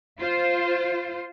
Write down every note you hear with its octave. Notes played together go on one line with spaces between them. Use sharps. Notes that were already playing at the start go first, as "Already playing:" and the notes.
F4 C5